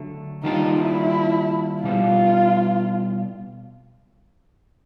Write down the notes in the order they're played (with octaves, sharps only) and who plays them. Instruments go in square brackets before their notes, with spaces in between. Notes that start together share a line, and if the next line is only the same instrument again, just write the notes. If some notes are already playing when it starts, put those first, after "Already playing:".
Already playing: [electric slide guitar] D3 F#3 A3
[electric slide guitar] D#3 G3 A#3 D4 F4 [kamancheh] D#4
[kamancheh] E4
[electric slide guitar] B2 G3 B3 [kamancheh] F4